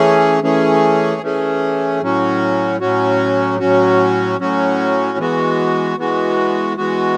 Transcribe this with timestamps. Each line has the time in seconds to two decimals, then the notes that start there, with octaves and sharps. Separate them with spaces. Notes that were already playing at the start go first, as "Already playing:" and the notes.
Already playing: E3 A3 C#4 G#4
0.42 E3 A3 C#4 G#4
1.22 E3 A3 C#4 G#4
2.02 A2 F#3 C#4 F#4
2.80 A2 F#3 C#4 F#4
3.59 A2 F#3 C#4 F#4
4.39 A2 F#3 C#4 F#4
5.18 E3 G#3 B3 F#4
5.97 E3 G#3 B3 F#4
6.77 E3 G#3 B3 F#4